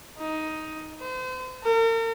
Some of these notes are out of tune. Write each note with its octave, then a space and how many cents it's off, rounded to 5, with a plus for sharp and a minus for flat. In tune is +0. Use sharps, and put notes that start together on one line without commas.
D#4 +10
C5 -40
A#4 -40